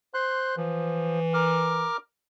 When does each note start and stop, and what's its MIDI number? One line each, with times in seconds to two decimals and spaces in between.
0.14 0.53 72
0.14 0.56 84
0.14 0.56 90
0.57 1.86 52
0.57 1.20 53
1.34 1.97 70
1.34 1.97 86
1.34 1.97 89